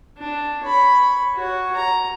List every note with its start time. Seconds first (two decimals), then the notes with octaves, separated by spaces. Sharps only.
0.18 D4
0.64 C#5 B5
1.35 F#4 C#5
1.76 A#5